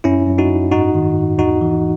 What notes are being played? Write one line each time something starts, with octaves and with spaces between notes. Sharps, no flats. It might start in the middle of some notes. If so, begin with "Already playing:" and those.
F#2 C#4 E4
F#2
D#4 F#4
F#2
G#2 D#4 F#4
D#3
G#2
E2 D#4 F#4
E3